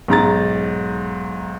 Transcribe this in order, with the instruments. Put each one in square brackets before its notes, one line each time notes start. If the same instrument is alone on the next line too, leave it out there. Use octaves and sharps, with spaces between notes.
[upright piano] B1 G#2 A#5 A6